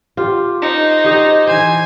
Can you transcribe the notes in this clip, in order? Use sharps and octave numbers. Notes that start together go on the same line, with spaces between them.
F4 G4
D#4 C5
G4 C#5 D#5
E3 C5 G#5